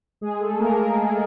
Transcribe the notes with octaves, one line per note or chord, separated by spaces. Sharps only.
G#3 G#4
A3 A4
A#3 A#4
A#3 A#4